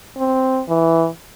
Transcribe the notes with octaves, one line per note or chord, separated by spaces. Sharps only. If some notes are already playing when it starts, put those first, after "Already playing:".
C4
E3